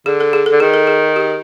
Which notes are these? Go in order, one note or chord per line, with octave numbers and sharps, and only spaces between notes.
D3 G#4
A4
G#4
A4
D3
D#3 G#4
A4
G#4
G4